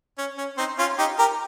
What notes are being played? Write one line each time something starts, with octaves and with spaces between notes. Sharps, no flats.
C#4
C#4
C4 D#4
C#4 F4
D#4 G4
G4 A#4